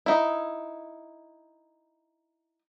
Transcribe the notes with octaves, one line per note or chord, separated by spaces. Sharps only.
D#4 E4